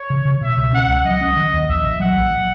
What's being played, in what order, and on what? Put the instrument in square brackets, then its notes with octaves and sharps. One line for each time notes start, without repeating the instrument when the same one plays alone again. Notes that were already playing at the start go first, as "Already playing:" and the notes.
Already playing: [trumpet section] C#5
[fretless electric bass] C#3
C#3
[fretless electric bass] B2 [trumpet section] E5
[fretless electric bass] C#2
[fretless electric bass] C#4 [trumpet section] F#5
[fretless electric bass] C#2
[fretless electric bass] F#3 [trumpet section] D#5
[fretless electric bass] C#4
D#3
D#2
[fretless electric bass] A#1 [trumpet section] E5
[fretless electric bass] A#1
[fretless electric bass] F#3 [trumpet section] F#5
[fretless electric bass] A#1